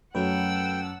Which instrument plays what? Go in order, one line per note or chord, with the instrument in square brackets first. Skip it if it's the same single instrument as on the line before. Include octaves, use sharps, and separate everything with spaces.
[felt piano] F#2 [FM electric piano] F#3 A3 B4 [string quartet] F#5 A5 E6 [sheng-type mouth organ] G5